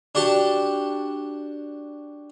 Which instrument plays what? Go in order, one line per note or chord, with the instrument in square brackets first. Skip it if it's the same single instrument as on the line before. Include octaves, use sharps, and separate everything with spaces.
[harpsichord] D4 F#4 G4 A5